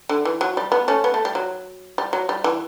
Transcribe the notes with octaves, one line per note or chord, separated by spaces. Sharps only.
D3
E3
F#3
G3
B3
A3 C#4
B3
A3
G3
F#3
G3
F#3
G3
E3